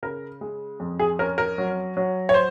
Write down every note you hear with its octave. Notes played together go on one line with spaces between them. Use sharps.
C#3 A#4
G#3
F2
G#4
C#4 A#4
A#4
F#3
F#3
C#5
C5